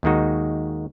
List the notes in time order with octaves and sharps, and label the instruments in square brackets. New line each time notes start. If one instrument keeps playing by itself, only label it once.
[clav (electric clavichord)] D#2 D#3 G#3 D#4 F#4